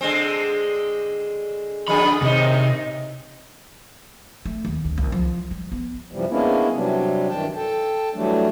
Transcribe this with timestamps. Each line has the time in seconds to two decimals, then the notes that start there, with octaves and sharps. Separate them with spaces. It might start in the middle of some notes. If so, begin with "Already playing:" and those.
0.01 D3 G#3 C4
1.88 F2 D3 G#4 B5
2.22 D#2 C3 D#4
4.45 A3
4.65 D#2
4.84 D2
4.98 C2
5.12 F3
5.51 G3
5.72 B3
6.12 F#2 C3 E3 F3 G3
6.29 G#3 A#3 B3 C#4 D4 E4
6.72 C3 F#3 G3 D4
7.29 G2 D#3 E3 D4 G5 A5
7.56 A4 G5 A5
8.14 E3 F#3 G3 A3 D4